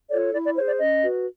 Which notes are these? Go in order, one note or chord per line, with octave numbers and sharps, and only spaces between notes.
F4 A4 C#5 D5
E4 D5
D5
G#4 C5 C#5
D5
C#4 D#5
F#4 B4